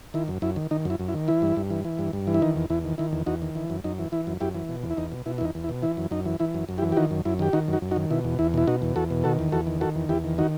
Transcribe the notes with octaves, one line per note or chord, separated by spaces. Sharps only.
D#3 E4
F#2
F#2 E4
D#3
D#3 D#4
F#2 E4
F#2
E4
D#3
E3 E4
G2
G2
E3
E3
G2
G2
E3
E4
D#3 D#4
E2
E2 E4
D#3
D#3 E4
E2
E2 D#4 F#4
D#3
E3
F#2
F#2 D#4
E3
E3 E4
F#2
F#2 E4 G4
E3
B2
E2
E4
E2 D#4
B2
B2 E4
E4
E2 D#4
E2
E4
B2
E3 E4
F#2
F#2 D#4
E3
E3 E4
F#2
F#2
E4 G4
E3
G4
D#3 D#4 F#4
F#2
F#2 E4
D#3 G4
D#3 D#4 F#4
F#2
D#4 F#4
F#2
D#4 F#4
D#3
B2 E4
E2
E2 E4
B2 E4
B2 D#4 F#4
E2
E2 F#4 A4
B2
D#3 F#4 A4
E2
E2 F#4 A4
D#3
D#3 F#4 A4
E2
E2 E4 G4
D#3
D#3 D#4 F#4